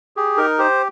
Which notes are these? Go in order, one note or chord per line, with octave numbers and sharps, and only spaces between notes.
G4 G#4
D#4 A#4
G4 C5